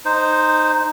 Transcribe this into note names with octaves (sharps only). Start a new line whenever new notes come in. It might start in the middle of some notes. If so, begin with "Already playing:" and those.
D#4 C5